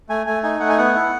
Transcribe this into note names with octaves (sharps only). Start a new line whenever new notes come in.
A3 G#5
A3 G#5
D#4 G#5
A3 F#5
G#5
B3 F#5
E4